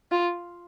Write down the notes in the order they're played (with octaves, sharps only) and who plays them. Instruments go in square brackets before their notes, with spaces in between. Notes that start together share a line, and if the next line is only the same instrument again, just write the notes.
[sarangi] F4